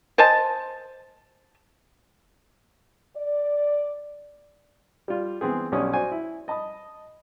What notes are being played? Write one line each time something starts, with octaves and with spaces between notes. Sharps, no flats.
C5 D#5 G#5 A5
D5
G3 F4
E3 B3 C4 G#4
B1 G3 C#4 D#6
F#4 C5 D5 G#5
E4
D#5 A5 B5 D#6